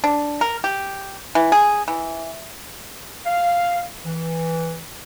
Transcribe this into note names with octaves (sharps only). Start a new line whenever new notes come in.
D4
A#4
G4
E3
G#4
E3
F5
E3